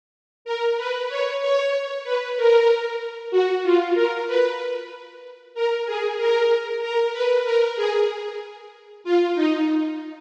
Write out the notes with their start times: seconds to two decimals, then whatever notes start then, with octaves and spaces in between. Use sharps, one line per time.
0.45 A#4
0.77 B4
1.09 C#5
1.42 C#5
2.04 B4
2.37 A#4
3.31 F#4
3.64 F4
3.95 A#4
4.27 B4
5.55 A#4
5.86 G#4
6.18 A#4
6.82 A#4
7.13 B4
7.45 A#4
7.76 G#4
9.04 F4
9.35 D#4